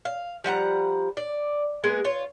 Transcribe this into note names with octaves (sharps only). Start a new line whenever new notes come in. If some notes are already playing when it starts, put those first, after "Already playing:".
F5
F3 G3 F#5 A#5
D5
G#3 A#3 B3 G#4
F4 C#5